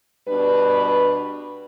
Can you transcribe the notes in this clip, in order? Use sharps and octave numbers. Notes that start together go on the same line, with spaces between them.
B2 G3 D4 B4